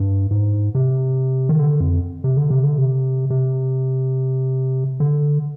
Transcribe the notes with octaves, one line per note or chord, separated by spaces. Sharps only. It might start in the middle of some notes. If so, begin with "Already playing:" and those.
Already playing: G2
G#2
C3
D#3
D3
F2
C3
D3
C3
D3
C3
C3
D3